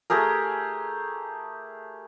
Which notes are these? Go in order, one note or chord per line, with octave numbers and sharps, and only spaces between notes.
A3 G4 G#4 A#4